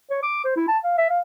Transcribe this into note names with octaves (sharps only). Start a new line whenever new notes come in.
C#5
D6
C5
E4
A5
F5
E5
F5